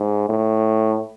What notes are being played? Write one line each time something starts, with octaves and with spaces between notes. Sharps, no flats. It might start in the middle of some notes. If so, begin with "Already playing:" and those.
Already playing: G#2
A2